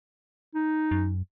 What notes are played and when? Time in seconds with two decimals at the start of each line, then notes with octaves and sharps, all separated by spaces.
0.55 D#4
0.91 F#2